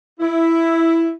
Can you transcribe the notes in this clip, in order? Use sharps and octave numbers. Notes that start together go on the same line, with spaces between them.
E4